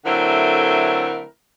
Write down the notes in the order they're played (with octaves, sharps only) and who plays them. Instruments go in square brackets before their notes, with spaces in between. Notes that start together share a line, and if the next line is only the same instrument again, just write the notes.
[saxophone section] D3 F#3 A3 C4 E4 A#4